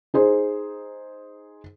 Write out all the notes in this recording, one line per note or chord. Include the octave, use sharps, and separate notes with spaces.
D#4 G#4 C5